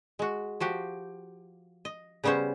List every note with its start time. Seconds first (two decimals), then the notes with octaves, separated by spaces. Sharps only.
0.19 G#3 F#4
0.60 F3 F#4 G4
1.85 D#5
2.24 C#3 G3 B3 C#4 C5